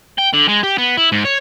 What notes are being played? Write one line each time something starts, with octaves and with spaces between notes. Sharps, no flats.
G5
D3
G#3
G4
B3
E4
G#2
C#5